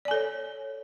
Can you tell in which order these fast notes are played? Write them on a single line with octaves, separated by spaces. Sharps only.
D5 G#5 A4 C#5